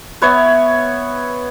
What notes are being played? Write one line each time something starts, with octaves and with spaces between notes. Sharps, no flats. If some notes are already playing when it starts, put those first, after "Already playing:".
B3 C#5 E5